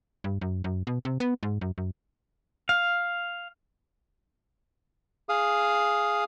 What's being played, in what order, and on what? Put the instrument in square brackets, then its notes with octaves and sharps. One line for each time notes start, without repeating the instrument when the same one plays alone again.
[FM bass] G2
F#2
F#2
B2
C3
B3
G#2
F#2
F#2
[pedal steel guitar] F5
[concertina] G#4 F5 D#6